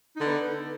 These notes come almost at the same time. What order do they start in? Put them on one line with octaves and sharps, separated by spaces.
D#4 D3 B3